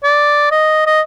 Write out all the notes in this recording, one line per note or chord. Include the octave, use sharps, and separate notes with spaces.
D5
D#5
D#5